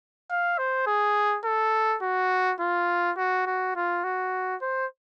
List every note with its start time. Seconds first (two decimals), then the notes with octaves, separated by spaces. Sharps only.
0.30 F5
0.58 C5
0.87 G#4
1.45 A4
2.02 F#4
2.60 F4
3.17 F#4
3.47 F#4
3.76 F4
4.04 F#4
4.62 C5